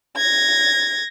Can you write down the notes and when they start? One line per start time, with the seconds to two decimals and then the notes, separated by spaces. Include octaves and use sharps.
0.17 G#6 A#6